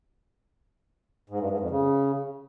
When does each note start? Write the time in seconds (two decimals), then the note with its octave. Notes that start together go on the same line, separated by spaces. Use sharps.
1.30 G#2
1.40 G2
1.50 G#2
1.60 F2
1.70 C#3